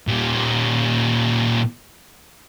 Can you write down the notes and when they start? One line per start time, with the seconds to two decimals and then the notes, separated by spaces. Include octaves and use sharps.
0.07 A#2 G3